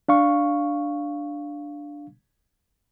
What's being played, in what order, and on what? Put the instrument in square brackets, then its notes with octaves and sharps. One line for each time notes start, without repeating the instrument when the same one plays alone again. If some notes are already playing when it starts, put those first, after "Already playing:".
[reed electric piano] D4 F5 C#6